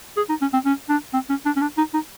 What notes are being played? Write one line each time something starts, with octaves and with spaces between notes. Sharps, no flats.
G#4
D#4
C#4
C4
C#4
D4
C4
C#4
D4
C#4
D4
D#4
D#4